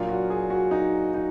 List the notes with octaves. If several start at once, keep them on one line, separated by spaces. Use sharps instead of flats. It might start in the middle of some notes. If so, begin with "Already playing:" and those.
Already playing: A#2 F#3 A#3 D4 F4
F#4
G#4
F#4
D#4
D#4